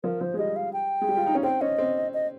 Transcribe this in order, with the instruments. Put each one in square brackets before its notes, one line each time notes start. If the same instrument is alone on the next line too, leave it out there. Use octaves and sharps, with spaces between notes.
[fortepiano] F3 [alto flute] A#4
[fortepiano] F3 [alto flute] C5
[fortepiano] G#3
[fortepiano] G3 [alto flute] D#5
[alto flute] F5
G5
[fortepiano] G#3
G3
F4
D#4
C#4
[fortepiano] C4 [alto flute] G5
[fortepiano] C#4 [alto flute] D#5
[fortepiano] C4
[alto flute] D#5